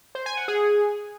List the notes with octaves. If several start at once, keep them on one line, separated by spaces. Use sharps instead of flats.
C5
G#5
F#5
G#4